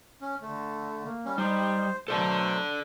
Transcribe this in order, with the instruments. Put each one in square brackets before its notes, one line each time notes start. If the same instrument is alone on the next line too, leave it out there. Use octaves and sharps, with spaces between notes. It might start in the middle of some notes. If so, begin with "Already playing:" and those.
[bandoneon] C#4
[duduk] D3 [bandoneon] A3
[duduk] A#3
[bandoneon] G3 C#4
[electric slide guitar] G3 [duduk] D#4 [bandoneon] C5
[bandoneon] B2 A3 C5 [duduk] F#3 [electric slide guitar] A4 D5 A5